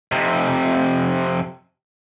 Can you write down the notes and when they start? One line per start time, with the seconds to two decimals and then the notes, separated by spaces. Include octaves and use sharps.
0.12 F2 C3